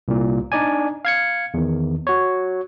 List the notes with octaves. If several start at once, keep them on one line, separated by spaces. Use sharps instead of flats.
C2 A#2
D4 D#4 D5 G#5
F5 G#6 C#7
E2 D#3
F#4 C#5